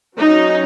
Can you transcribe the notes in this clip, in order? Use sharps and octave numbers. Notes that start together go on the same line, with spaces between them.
F#3 C#4 D#4